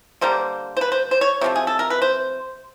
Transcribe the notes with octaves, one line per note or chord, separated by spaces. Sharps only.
D3 G3 A#3 C5
C5
B4
C5
C5
C#5
C3 F3 A3
G#4
A4
A#4
B4
C5